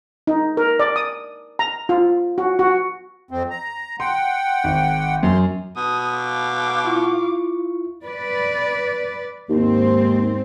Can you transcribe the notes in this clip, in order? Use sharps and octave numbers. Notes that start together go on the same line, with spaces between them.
D#4
A#4
D5
D#6
A#5
F4
F#4
F#4
F2 C4
A#5
F#5 G5 C6
G#1
F#2 C6
B2 D#6
F5 D6
E4 F4 C#6
B4 D5
D#2 G#2 C4